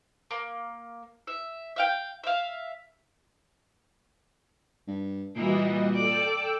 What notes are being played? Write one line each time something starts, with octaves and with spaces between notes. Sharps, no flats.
A#3
E5
E5 F5 G5
E5 F5
G2
A#2 E3 G3 A#3 F#4 D#5
A4 D5 G5 E6